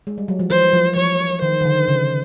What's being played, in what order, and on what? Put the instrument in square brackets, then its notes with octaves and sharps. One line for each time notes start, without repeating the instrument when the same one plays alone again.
[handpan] G#3
G3
F#3
F3
[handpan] E3 [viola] C5
[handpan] F3
[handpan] F3 [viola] C#5
[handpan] D#3 [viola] C5
[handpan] D#3
D3
C#3